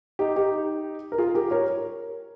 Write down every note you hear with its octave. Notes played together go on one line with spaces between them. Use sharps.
D#4 G4
D#4 G4
A#4
F4 G#4
G4 A#4
A#4 C#5